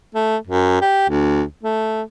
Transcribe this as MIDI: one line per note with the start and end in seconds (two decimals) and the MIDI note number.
0.15 0.37 57
0.48 0.81 42
0.81 1.08 67
1.10 1.43 38
1.63 2.02 57